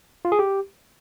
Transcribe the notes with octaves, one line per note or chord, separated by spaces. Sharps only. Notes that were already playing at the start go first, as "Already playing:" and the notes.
F4
G#4
G4